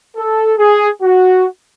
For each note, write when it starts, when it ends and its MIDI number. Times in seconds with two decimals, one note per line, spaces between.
0.17 0.53 69
0.59 0.89 68
1.02 1.46 66